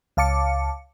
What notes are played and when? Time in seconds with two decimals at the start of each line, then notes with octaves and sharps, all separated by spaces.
0.17 C#2 F5 A5 D6 C#7